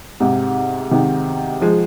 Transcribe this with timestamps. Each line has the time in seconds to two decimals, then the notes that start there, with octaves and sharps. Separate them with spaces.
0.20 G#2 C3
0.91 C3 D#3
1.61 F3 G#3